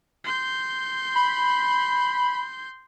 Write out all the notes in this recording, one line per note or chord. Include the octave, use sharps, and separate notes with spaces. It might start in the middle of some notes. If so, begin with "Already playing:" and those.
C6 G6
B5